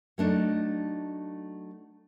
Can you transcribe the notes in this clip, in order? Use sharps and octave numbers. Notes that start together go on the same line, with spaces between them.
F#3 A3 D4 D#4